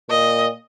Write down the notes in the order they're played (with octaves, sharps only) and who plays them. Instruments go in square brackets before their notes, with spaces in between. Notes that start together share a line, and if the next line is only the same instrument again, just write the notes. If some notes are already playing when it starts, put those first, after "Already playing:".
[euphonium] A#2 [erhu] D#5